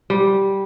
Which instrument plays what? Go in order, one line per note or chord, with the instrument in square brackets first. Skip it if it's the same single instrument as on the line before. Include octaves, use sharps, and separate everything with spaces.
[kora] G3